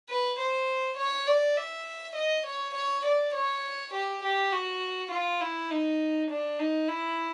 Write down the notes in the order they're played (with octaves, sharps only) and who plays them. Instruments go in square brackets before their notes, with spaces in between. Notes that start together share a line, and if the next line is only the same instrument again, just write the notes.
[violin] B4
C5
C#5
D5
E5
D#5
C#5
C#5
D5
C#5
G4
G4
F#4
F4
E4
D#4
D4
D#4
E4